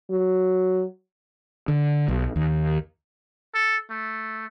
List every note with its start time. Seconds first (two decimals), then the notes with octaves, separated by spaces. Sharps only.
0.11 F#3
1.68 D3
2.08 B1
2.36 D#2
3.55 A4
3.91 A3